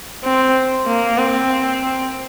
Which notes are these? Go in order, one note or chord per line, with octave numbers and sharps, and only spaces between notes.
C4
A#3
C4